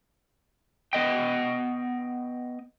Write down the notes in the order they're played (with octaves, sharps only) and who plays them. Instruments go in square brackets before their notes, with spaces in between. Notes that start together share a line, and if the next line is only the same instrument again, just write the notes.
[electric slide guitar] B3 D#5 G5